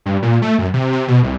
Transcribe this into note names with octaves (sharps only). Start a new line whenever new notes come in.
G2
A#2
A3
F#2
C3
C3
B2
C2